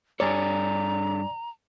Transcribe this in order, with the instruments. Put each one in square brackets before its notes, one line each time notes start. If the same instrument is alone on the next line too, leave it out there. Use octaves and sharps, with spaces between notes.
[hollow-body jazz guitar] G2 C#5 [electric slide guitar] D4 G#4 A4 [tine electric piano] D5 G#5 [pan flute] A#5